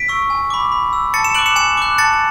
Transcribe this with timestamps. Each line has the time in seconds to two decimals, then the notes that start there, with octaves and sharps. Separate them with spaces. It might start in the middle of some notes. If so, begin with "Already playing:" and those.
Already playing: B6 D7
0.08 C#6 E6
0.30 G#5
0.50 B5 D6
0.72 B5
0.93 E6
1.14 A5 A6 C#7
1.24 C#7 E7
1.35 D6 F#6 D7 F#7
1.46 C#7 E7
1.56 G#5 C#7 E7
1.77 D6 F#6
1.98 A5 A6 C#7